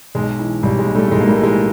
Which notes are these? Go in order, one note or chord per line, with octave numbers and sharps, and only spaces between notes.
B1 G#3
E3
B1 G3
G#3
A2
G3 A3
A3
B1 G#3
A#3
G3 A3
E3
G#3